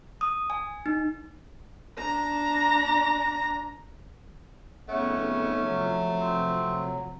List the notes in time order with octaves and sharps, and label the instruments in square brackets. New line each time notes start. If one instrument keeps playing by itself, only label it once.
[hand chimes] D#6
G#5
D#4
[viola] D4 A#5
[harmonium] F2 C#3 F#5 [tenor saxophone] A3 [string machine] B3 D#4 G#4 [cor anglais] C#4
[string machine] C3 F3 [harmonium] F#3
[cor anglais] C4